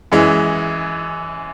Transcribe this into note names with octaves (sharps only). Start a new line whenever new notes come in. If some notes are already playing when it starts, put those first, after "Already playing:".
F#2 E3 G#3